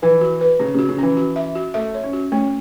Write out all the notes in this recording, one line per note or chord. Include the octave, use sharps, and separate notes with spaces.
E3 B4
F#4
B4
C#3 C#4
C#3 F#4
C#3
E3 C#4
F#4
E5
F#4
A3 E5
C#5
C#4
F#4
A3 C#4